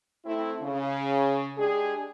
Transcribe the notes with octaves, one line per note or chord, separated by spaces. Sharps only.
A3 C4 E4
C#3
G#3 D4 G4 G#4